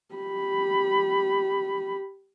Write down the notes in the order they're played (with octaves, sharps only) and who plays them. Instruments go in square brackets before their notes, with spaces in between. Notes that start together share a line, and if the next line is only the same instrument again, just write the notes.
[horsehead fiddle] G4 B5